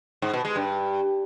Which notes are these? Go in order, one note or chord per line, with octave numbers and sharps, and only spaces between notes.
G#2
B2
G#3
G2